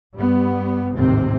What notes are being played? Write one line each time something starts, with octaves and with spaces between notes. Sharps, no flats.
G2 G3 B3
A1 D#2 G#2 C3 C4